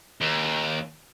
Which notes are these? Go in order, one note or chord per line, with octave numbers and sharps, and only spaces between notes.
D#2